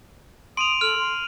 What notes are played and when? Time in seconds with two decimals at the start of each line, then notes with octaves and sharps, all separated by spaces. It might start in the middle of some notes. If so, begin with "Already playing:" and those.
0.57 C6 D#6 D7 D#7 F7
0.81 A4 F6 F#7
0.99 C6